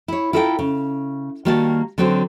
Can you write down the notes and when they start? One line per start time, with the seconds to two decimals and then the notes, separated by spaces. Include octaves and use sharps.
0.08 E4 C#5
0.33 E4 F4 A4 A#4 D#5 G5
0.59 C#3
1.45 D#3 G3 A#3 F#4 F5 A5
1.98 D3 F#3 C4 F#4 C5